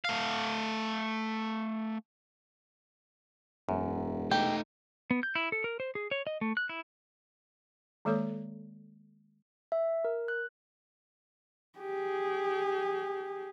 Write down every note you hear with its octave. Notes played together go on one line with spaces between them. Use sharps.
A3 F5
E1 F#2
A3 D#4 G4
B3
G6
E4
A4
A#4
C5
G#4
C#5
D#5
A3
F#6
E4
D#3 G#3 A#3 A4 C#5
E5
A#4
F#6
G4 G#4